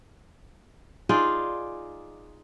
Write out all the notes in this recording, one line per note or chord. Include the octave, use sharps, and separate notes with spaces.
D#4 F4 G#4 D5